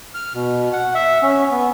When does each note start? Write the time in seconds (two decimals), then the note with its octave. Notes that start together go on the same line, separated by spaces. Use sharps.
0.14 F6
0.34 B2
0.73 F#5
0.95 E5
1.23 C#4
1.51 B3